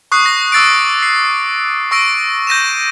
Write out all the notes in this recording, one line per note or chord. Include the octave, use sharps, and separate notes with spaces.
C#6 D#6 F#6 C7
A#6
D6 E6 A6 C7 D7
C7
C#6 E6 A#6 D7
G6 A#6 D#7 E7